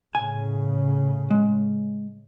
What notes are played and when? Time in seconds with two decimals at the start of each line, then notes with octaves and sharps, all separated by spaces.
0.15 A2 C#3 G#5
1.30 G#3